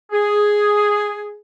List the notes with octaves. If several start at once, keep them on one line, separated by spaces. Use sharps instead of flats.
G#4